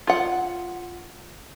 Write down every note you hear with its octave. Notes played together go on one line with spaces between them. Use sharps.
F4 F#5